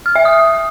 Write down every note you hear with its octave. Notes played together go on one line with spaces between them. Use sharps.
F6
E5
D#6